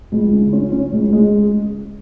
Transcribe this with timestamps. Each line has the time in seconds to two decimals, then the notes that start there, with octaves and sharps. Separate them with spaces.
0.12 C#2
0.32 C#3
0.53 C#4
0.72 C#4
0.92 C#2
1.13 G#3